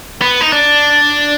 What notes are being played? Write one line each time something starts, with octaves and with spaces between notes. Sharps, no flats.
B3
D#4
D4